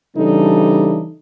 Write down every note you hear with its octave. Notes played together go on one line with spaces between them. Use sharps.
C#3 E3 G3 D4 D#4 A4